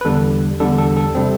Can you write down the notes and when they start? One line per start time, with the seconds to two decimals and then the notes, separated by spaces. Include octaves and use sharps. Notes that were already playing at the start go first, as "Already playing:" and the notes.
0.01 B4
0.05 E2 D3 G3 A4
0.60 E2 D3 G3 A4
0.78 A4
0.97 A4
1.15 C3 G3 C4